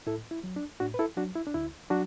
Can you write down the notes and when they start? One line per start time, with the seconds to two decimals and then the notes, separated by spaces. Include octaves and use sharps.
0.07 A2 E4 A4
0.31 E4
0.44 F#3
0.56 D4
0.80 A2 D4 F#4
0.94 B4
0.99 E4 A4
1.17 F#3 D4 F#4
1.35 E4
1.47 D4
1.54 D2 E4
1.90 F#3 D4 F#4